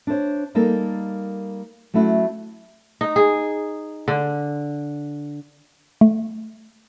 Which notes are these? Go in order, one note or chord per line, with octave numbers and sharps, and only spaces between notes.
D4 E4 A4 C5 C#5
G3 A#3 D#4 A4 A#4
F#3 A3 C#4 E4 F#4
D#4
G#4
D3
A3